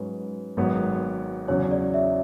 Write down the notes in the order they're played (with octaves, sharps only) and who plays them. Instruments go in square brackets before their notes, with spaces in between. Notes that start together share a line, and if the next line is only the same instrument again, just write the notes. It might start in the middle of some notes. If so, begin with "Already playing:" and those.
Already playing: [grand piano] G#2 F#3 C#4 [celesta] B4
[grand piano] G#1 G#2 F#3 B3
[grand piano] E2 C#3 F#3 [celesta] C#5
[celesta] D5
E5